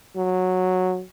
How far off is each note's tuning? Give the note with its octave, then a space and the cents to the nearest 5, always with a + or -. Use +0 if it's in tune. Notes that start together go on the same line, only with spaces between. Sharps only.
F#3 -10